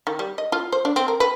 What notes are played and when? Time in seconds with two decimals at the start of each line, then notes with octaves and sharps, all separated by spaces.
0.07 D#3
0.19 G3
0.38 D#5
0.52 F4
0.72 C5
0.85 D4
0.96 C4
1.08 A#4
1.20 B4